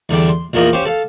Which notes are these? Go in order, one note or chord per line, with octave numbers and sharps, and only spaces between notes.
E2 D3 G3 G5
C6
A#1 E2 F3 A#4 D#5
C#4 G4 C5 F5
A4 F5